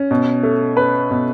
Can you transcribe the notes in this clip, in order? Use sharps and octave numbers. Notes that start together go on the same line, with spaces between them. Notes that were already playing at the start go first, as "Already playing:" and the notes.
Already playing: C#4
B2
A3
C#4 B4
B2